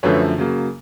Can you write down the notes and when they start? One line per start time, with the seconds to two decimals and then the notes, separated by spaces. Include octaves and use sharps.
0.03 F#2 D3 F3 A3 B4 C#5
0.38 C#3 F#3 A#3